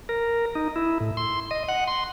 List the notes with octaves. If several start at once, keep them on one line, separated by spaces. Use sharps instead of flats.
A#4
D#4
E4
A2
C6
D#5
F#5
C6